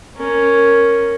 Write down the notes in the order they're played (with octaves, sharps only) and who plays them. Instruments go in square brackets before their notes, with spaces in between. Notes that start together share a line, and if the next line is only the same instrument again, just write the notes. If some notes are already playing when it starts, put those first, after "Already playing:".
[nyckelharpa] C#4 A#4